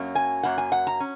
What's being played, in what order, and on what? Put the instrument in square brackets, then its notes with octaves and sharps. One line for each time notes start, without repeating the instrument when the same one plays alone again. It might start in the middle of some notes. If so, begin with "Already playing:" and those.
Already playing: [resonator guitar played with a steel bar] F#2 F#3 A#3 C#4
G#5
F#2 F#3 A#3 F#5
G#5
F#5
A#5
C#4